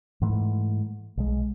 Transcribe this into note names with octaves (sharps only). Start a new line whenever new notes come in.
G#2 E3 A3
B1 G#3